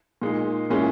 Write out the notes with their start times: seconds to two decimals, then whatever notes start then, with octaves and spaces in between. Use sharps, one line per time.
0.22 A#2 G#3 D#4
0.70 A#2 G#3 C#4 E4